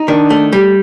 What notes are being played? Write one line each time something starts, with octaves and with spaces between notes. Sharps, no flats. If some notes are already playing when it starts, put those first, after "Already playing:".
Already playing: D#4
D#3 D4
A3
G3